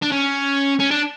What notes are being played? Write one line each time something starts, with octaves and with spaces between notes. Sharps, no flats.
D4
C#4
C#4
D4